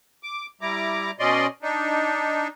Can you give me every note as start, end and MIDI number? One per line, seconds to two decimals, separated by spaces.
0.23 0.46 86
0.61 1.11 55
0.61 1.11 64
0.61 1.11 82
0.61 1.11 86
1.19 1.47 47
1.19 1.47 61
1.19 1.47 74
1.19 1.47 75
1.19 1.47 84
1.62 2.48 62
1.62 2.48 63